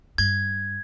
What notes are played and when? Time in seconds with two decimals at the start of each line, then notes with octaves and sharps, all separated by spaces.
0.18 G2 G#6